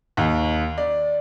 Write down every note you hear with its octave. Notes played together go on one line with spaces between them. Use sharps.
D#2
D5